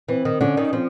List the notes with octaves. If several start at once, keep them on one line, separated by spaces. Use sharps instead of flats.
E3 C4
D#3
D3 C#4
D#3
F3 C4